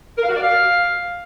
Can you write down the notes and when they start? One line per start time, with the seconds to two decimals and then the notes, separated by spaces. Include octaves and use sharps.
0.17 A#4
0.23 F5
0.29 F#4
0.35 D5
0.41 F5